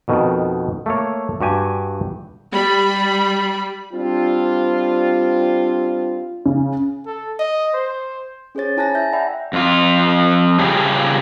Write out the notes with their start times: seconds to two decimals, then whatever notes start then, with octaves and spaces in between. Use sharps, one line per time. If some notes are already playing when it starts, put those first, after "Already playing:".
0.08 F2 B2 D#3
0.86 A3 A#3 C#5
1.41 G2 F#4 G4 G#5
2.52 G3 B5
3.94 G3 C4 D4 F4
6.46 C#3
7.06 A4
7.39 D#5
7.74 C5
8.55 C#4 G#4 C5 C#5 A6
8.77 E4 G#5 A5 F#6 A6 A#6
8.95 E5 G#5 G6 A#6
9.13 D5 E5 F#5 G5 A#5 B5
9.53 F2 F4
10.59 C#3 G3 F4 G4 G#4